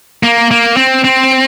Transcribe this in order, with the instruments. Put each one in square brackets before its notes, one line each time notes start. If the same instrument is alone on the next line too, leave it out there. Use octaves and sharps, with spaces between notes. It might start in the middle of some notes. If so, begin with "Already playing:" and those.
[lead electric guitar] A#3
A#3
C4
C4